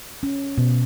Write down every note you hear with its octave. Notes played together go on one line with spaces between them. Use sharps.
C#4
B2